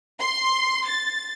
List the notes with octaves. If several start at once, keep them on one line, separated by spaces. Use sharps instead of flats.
C6
A6